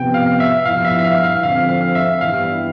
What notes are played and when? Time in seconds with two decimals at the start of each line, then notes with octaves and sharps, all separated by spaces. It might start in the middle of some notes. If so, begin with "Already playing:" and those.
Already playing: C3 F3 B3 G5
0.14 F5
0.40 E5
0.65 G2 F3 B3 E4 F5
0.85 E5
0.99 E5
1.04 F5
1.24 F5
1.43 D3 F3 C4 F5
1.69 F5
1.95 E5
2.21 G2 E3 G3 B3 E4 F5